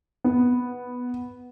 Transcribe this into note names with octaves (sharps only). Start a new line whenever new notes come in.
B3